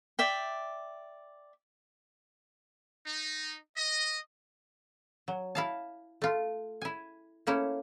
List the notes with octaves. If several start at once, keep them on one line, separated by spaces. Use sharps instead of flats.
D5 E5 G5
D#4
D#5
F#3
E4 F5 A5
A3 F4
E4 G#5
A3 A#3 C#4 E4